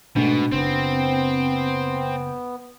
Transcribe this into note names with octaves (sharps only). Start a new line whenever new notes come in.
G#2 B2 A3 D4
F#1 B3 C4